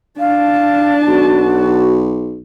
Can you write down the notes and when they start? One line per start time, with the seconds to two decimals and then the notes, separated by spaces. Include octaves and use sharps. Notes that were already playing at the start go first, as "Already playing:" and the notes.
0.19 D4 F5 A5
1.08 B1 F#4